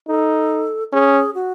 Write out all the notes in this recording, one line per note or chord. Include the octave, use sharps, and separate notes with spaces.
D#4 A4
C#4 G#4
F#4